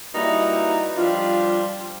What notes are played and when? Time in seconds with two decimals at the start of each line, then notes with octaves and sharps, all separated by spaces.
0.14 G3 A#3 D#4 E4 F#4 B4
0.96 F3 G3 D4 F4